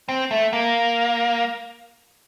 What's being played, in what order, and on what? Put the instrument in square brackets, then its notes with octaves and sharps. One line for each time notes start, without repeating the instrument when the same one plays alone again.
[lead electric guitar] C4
A3
A#3